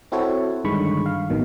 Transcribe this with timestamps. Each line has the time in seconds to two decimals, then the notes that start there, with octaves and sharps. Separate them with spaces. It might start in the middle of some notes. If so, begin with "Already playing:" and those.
0.12 C4 E4 F#4 A4 C#5
0.64 G2 D3 D#3 G#3 B5 C#6
1.06 F5
1.30 A1 B2 D#3